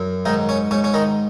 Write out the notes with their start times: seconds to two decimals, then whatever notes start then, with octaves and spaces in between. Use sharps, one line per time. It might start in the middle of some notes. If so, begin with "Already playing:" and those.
Already playing: F#2
0.25 G#2 D#3 D#4
0.49 C#4
0.71 G#2 C#4
0.84 C#4
0.94 D#3 D#4